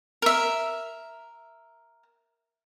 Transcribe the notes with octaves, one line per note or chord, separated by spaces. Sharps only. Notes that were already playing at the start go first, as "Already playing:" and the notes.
A#4 E5